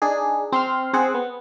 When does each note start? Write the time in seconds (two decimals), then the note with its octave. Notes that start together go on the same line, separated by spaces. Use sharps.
0.02 D4 D#4 G#4
0.52 C4 C6 F6
0.93 C4 G#4 F#5
1.14 B3